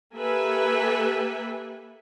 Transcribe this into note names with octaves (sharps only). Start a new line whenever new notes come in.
A#3 G4 A4 B4 E5 G#5